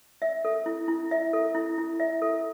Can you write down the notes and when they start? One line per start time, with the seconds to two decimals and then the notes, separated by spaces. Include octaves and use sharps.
0.22 E5
0.45 A4
0.66 E4
0.88 E4
1.11 E5
1.33 A4
1.55 E4
1.78 E4
2.00 E5
2.22 A4